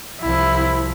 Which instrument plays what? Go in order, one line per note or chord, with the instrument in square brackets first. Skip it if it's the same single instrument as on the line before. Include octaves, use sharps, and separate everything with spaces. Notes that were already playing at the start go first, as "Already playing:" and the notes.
[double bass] C2 F3 [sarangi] E4